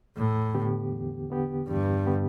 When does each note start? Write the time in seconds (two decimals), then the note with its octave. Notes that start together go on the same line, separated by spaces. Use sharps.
0.16 E2 A2
0.54 D3 B3 G4
0.92 E2
1.30 D3 B3 G4
1.68 E2 G2
2.07 D3 B3 G4